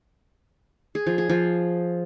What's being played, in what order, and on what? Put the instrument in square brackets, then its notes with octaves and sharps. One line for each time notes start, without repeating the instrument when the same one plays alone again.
[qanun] G#4
F3
G#4
F3